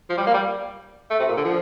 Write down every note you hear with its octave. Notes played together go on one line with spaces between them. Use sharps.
F3
G3
A#3
G3
A3
C3
A#2
D3
F3